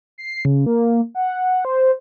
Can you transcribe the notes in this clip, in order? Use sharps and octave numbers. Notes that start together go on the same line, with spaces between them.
C7
C#3
A#3
F#5
C5